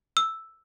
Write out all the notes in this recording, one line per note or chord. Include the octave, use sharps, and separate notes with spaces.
E6